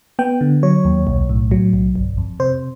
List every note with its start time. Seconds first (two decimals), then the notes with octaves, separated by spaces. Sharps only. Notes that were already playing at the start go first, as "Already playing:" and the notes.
0.19 B3 G5
0.41 D3
0.63 F#3 C#5
0.85 D#2
1.07 B1
1.29 A2
1.51 F#3
1.73 B1
1.96 G1
2.18 F2
2.40 C3 C5